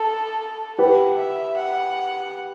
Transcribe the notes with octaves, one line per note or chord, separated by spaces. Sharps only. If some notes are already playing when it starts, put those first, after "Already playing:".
Already playing: A4
G4 B4 F#5
E5
F#5